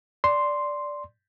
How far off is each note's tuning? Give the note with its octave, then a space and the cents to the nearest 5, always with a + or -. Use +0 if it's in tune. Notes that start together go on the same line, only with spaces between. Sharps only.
D5 -5 C6 +0